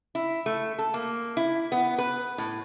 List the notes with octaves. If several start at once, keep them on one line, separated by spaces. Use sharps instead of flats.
E4
A3
A4
A#3
E4
B3
B4
A2